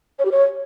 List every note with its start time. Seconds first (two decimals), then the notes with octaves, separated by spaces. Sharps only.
0.19 C#5
0.25 G4
0.31 C#5